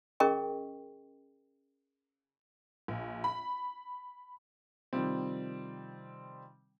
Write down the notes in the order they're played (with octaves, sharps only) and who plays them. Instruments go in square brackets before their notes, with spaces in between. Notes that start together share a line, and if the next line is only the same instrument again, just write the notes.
[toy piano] C#4 G#4 A#4 D#5 G5 C#6
[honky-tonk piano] A#1
B5
[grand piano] C3 D#3 F3 G3 C4